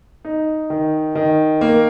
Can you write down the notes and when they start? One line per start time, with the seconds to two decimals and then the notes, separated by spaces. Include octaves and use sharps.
0.25 D#4
0.70 D#3
1.15 D#3
1.61 A#3